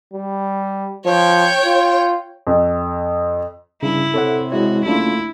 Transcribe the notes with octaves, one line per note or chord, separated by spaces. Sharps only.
G3
F3 C#5 G5
F4
F2
G2 C#3 E4
C3 A4 C#5 F#5
G#3 E4 F#4 C#5
F#1 A3 D4 E4 F4